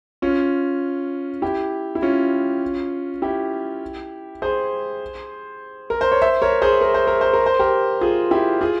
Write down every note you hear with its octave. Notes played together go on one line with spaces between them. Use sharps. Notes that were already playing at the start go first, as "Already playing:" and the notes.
C#4 F4
E4 G4
E4
C#4 F4
E4 G4
G#4 C5
A#4
C5
C#5
C5 E5
A#4 C#5
G#4 C5
A#4
C5
A#4
C5
A#4
C5
G4 A#4
F4 G#4
E4 G4
F4 G#4